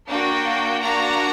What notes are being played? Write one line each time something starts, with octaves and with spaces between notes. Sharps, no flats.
A#3 D4 F#4 G5
A#3 D4 F#4 A#5